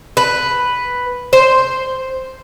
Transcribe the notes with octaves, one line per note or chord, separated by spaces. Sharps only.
B4
C5